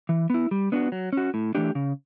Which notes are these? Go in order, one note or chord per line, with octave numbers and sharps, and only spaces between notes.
E3
B3 E4
G3
B3 D4 F#4
F#3
C#4 F#4
A2
E3 A3 D4 G4
C#3